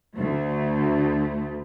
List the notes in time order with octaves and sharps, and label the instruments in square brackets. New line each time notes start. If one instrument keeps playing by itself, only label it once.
[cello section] D2 A3